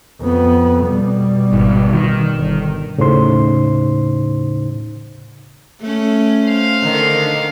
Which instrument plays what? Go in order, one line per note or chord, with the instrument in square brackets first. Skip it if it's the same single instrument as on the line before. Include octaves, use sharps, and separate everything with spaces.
[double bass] F2 B3
B2 G3
[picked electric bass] G#1
D#3
[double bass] G1
[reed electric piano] D#2 A2 C#3 D#4 C5 C6
[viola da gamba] A3 C#4
[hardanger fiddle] C5 F5
[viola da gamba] D3 D#3